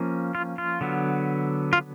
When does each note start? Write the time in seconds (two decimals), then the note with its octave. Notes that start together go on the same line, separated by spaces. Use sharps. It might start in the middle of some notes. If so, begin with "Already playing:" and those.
Already playing: F3 A#3 C#4
0.35 F4
0.58 F4
0.81 D3 F#3 B3
1.73 F4